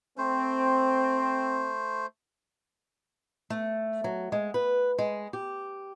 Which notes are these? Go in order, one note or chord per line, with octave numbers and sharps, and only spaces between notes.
A3 C4 C5
A3
F#3
G#3
B4
G#3
G4